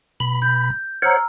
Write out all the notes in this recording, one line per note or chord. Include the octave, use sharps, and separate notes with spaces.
B2 B5
G6
C5 C#5 F#5 A#5 E6 F6